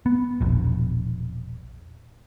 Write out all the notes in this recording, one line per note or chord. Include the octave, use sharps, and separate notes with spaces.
B3
E1 A#1